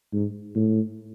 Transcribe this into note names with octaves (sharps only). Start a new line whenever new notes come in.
G#2
A2